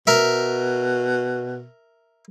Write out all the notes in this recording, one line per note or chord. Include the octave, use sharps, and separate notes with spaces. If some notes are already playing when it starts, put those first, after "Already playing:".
B2 A#4 E5